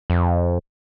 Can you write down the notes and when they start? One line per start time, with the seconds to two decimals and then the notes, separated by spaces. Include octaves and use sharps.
0.10 F2